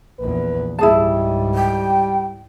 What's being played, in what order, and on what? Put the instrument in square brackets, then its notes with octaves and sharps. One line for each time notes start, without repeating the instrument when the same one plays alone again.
[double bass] A#1 E2 [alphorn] B4
[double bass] C#2 G#2 [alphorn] G3 [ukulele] E4 G#4 A5
[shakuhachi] G5